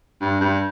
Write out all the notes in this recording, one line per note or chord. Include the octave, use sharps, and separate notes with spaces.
G2
G2